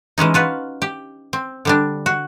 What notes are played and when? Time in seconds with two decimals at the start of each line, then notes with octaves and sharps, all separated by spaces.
0.18 E3 G#3 C#4 D#4
0.34 F4 F#4 B4
0.82 G4
1.33 C4
1.65 D3 G3 D4
2.06 F#4